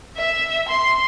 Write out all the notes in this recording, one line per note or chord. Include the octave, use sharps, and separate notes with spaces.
E5
C6